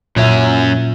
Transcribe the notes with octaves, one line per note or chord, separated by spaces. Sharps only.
F#2 A#2 C#4 E5